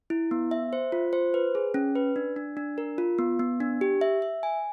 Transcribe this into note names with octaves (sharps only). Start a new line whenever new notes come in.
E4
B3
E5
C5
F4
C5
B4
G#4
C#4
B4
D4
D4
D4
A#4
F4
B3
B3
D4
G4
E5
E5
G#5